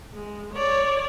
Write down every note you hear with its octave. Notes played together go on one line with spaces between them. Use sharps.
G#3
C#5 D5